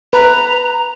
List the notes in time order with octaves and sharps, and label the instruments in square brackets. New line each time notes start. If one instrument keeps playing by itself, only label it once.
[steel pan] B4 [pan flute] A#5